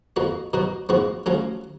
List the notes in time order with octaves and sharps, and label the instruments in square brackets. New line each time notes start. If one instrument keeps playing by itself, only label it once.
[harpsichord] F2 F3 B3 F#4
B2 F#3 B3 F#4
G#2 F3 B3 F#4
F3 A3 C#4 F#4